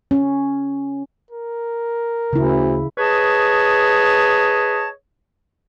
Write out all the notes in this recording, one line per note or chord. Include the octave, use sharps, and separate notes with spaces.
C#4
A#4
D2 C#3 E4
G#4 B4 C#5 D#5 A5